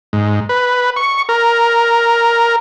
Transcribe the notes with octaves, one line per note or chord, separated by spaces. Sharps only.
G#2
B4
C#6
A#4